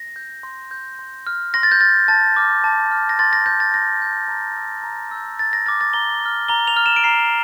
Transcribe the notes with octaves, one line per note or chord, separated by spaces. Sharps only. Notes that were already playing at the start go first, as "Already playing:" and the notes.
Already playing: A#6
G6
C6
G6
C6
F6
C6 A#6
A6
G6
F6 A6
A5 A6
D6 F6
A5
D6 F6
A#6
C6 A6
A#6
G6 A#6
A6
C6 A#6
G6
A#5
E6 G6
A#5
E6 G6
A#5 A6
A#6
D6 F6 A6
A6
A#5 G7
D6 F6
A#5 G7
F7
F6
E7
D7
A#5 C7